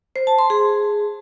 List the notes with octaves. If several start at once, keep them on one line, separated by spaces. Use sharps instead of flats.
C5
A5
C6
G#4